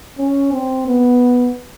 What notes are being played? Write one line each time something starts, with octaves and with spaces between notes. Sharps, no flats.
C#4
C4
B3